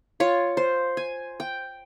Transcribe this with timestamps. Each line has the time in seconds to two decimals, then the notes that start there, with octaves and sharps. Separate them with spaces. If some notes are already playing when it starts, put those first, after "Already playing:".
0.20 F4 C#5
0.57 C5
0.97 G#5
1.40 G5